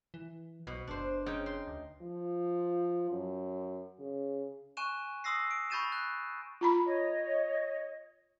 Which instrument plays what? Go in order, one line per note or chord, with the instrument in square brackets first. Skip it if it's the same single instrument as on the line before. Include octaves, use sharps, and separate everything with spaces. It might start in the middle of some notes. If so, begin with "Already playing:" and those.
[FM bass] E3
[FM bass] B1 [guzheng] B2
[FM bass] F#1 [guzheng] D4 C5
[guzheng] C#3 D#4 G5
C6
[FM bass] D2
[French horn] F3
F#2
C#3
[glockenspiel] G#5 C#6 F#6 D#7 E7
C6 D#6 E6 A#6 C7
D7
B5 C#6 G6 A6 D#7 E7
F#6
[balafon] F4 A#5 B5
[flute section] C#5 D#5